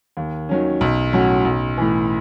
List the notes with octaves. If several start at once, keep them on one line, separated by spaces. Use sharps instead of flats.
D#2
D#3 F#3 C#4
B1
A2 F#3 C#4 F#4
B1
A2 E3